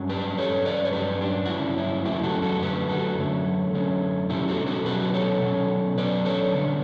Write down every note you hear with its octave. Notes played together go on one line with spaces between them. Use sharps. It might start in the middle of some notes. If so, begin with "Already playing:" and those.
Already playing: G2 F#3 C#4
G4 B4
G2 F#3 C#4 A4 C#5
B4 D5
C#5
G2 F#3 C#4 G4 B4
D4
F#4
G2 F#3 C#4 E4
E4
F#2 D3 A3 C#4 E4 G4
F#4 A4
F#4 A4
F#2 D3 A3 G4 B4
F#4 A4
F#2 D3 A3 C#4
F#2 D3 A3 C#4
B2 F#3 C#4 E4 G4
F#4 A4
F#4 A4
B2 F#3 C#4 G4 B4
A4 C#5
B2 F#3 C#4
B2 F#3 C#4 B4 D5
A4 C#5
D3 G3 B3 D4